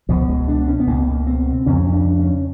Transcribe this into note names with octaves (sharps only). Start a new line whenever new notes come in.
C#2 B2 F3
G#3
D4
C#4
B3
C#2 B2 A#3
C4
F2 C#3 C#4
D4
C#4